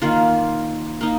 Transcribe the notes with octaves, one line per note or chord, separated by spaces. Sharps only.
D#3 A#3 F4
A#3 D#4